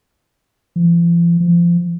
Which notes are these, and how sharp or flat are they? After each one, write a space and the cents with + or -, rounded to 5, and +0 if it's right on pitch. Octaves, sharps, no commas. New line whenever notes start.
F3 -45
F3 -25